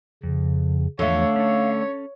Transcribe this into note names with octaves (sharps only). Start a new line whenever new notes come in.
F2 C#3
E2 D3 F3 A3 C#5 F5
C#4 A4 C#5